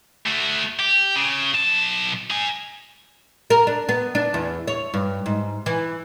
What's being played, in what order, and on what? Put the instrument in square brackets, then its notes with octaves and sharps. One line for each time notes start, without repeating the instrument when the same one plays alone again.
[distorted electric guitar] A3 F#4
G4
C#3
B1 A5
D#4 G#5
[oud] A#4
D4
B3
D4
E2
C#5
G2
G#2
E3